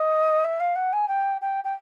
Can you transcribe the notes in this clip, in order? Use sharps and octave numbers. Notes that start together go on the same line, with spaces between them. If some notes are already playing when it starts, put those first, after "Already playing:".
Already playing: D#5
E5
F5
F#5
G#5
G5
G5
G5